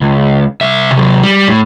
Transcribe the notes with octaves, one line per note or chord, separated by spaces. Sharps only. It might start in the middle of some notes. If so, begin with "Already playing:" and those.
C#2
C2 E5
C3 F#3
G3
A2